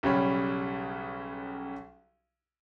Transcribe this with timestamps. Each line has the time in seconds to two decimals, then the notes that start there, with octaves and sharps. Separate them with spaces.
0.03 B1 C#3 G3 G4 C#5 B5